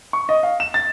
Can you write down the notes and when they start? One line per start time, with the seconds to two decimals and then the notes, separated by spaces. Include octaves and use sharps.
0.13 C#6
0.29 D#5
0.43 F5
0.60 E7
0.74 A6